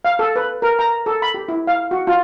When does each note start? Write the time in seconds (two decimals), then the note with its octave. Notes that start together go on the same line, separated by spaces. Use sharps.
0.05 F5
0.19 A4
0.36 B4
0.62 A#4
0.79 A#5
1.06 A4
1.22 B5
1.34 G4
1.48 E4
1.67 F5
1.91 F#4
2.07 F4